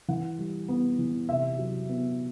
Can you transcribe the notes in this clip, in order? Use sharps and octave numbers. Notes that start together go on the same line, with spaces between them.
E3 F#5
G3
B3
E3
C3 E5
F#3
B3